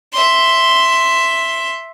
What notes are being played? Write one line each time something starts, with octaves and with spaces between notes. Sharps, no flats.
E5 C6